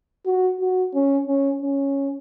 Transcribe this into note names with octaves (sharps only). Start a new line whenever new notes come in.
F#4
F#4
C#4
C#4
C#4